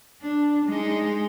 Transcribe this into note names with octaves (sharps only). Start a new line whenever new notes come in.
D4
G#3 D#4